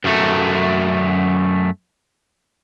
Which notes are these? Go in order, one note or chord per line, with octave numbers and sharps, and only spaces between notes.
F#2 A3